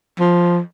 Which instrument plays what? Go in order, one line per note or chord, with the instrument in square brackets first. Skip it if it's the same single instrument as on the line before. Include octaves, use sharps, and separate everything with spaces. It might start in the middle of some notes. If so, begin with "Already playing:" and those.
[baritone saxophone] F3